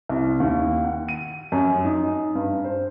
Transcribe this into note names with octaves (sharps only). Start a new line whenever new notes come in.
C2
D#2
F#5
D#7
F#2
D#4
G2
C5